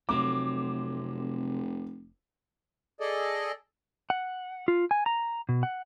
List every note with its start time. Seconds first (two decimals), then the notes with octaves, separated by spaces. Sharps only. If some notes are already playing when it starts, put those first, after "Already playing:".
0.09 F1 C3 F#3 A3 D6
3.00 G#4 A4 D5 D#5
4.10 F#5
4.68 F4
4.91 G#5
5.06 A#5
5.49 B2
5.63 F#5